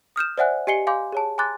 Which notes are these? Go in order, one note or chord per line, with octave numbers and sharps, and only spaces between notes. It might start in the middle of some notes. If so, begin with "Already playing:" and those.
D#6 F6 G6 E7
C5 D5 E5 F#5 G#5 F#6
G4 D#5 G#5 C7 C#7 G7
F5 G#5 C6 D6 G6
G#4 C#5 A5
G#5 A#5 C6 D6 F#6 A6